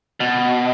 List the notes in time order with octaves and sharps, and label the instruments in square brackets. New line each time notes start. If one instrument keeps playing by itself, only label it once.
[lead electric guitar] B2